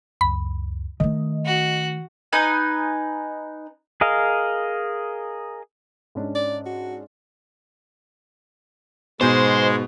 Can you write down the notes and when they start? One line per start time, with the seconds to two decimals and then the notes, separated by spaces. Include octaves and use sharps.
0.21 C#2 F#2 B5
1.00 D#3 A3 D#5
1.45 F#4
2.33 D#4 B4 G#5
4.01 G#4 A#4 D#5 F5
6.15 G#2 C#4 D4
6.35 D5
6.66 F#4
9.21 G#2 B2 G#3 C5 G#5 G6